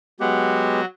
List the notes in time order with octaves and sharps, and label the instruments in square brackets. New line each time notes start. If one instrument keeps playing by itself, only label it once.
[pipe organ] F#3 F#4 [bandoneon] G#3 B3 G4